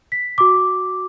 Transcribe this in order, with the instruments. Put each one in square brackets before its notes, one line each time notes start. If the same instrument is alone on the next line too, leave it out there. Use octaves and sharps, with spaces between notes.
[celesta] B6
F#4 D6